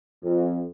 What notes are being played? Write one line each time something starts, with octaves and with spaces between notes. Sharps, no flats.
F2